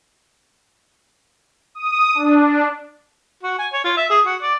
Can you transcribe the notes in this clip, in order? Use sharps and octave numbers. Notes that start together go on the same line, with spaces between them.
D#6
D4
F#4
G#5
C#5
F4
E5
G#4
F#4
D5